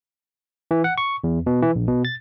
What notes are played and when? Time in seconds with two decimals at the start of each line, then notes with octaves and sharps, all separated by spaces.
0.71 E3
0.84 F#5
0.98 C#6
1.24 E2
1.46 B2
1.62 E3
1.76 A#1
1.87 B2
2.05 A6